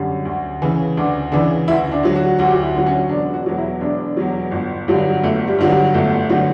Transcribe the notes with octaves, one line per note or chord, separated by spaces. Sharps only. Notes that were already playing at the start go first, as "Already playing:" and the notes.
Already playing: F#2 D3 G3
D2
C#3 E3
D2 D4
C#3 E3 D4
D2 E4
D4
D3 F#3
F#4
D2 F#4
G4
F#4
E4
D3 F#3
C#4
E1 D4
F#4
E2 B2 F#3
E4
E1 D4
E2 B2 F#3
G1
G2 D3 F#3
G1 A3
G3
G2 D3 F#3
G3
G1 A3
D3 F#3